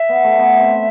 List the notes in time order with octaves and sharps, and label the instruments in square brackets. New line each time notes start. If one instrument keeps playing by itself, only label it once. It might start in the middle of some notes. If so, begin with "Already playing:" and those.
Already playing: [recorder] E5
[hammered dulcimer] B3
A3
B3
C4